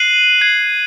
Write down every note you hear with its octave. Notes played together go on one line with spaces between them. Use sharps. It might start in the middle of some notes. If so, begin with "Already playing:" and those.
Already playing: F#6 C7 D#7 F#7
G#6 C7 F#7